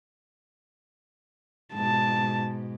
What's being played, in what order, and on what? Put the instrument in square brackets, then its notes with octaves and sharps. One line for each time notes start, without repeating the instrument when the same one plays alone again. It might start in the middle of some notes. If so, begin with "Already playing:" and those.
[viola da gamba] G#2 B2 [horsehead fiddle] A5